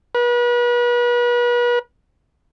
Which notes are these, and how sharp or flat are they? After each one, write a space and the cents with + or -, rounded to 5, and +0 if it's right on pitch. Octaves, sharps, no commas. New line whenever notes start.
B4 -35